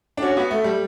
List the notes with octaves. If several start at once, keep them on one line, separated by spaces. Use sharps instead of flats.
D4
C#4 F#4
B3
A3
G3